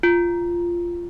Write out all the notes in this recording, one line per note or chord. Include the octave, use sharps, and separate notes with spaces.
F4